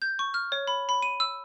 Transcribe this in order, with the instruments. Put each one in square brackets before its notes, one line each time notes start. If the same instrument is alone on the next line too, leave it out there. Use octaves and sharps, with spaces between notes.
[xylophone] G6
C#6
F6
C#5
B5
B5
D#7
E6